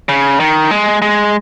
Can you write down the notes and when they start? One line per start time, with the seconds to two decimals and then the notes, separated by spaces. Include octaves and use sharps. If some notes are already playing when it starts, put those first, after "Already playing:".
0.09 C#3
0.40 D#3
0.71 G#3
1.02 G#3